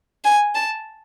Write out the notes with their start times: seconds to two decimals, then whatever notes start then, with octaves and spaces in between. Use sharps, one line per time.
0.24 G#5
0.55 A5